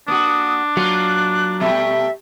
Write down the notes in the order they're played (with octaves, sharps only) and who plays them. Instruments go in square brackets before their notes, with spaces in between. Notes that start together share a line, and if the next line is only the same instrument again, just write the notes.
[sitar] A#3 F#4 [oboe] D4 [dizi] D#6
[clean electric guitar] F#3 [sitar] A#3 F4 [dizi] F#6
[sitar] B2 G3 A3 [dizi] E5